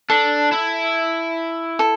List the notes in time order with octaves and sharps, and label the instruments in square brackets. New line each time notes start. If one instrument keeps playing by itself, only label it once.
[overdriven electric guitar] D4 [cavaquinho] A4
[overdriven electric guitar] E4
[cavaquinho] A4